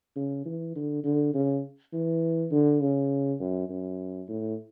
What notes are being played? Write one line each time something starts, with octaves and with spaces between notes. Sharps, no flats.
C#3
E3
D3
D3
C#3
E3
D3
C#3
F#2
F#2
A2